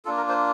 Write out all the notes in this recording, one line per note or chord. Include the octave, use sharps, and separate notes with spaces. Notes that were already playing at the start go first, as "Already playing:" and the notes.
A#3 D4 F4 A4
A#4
C5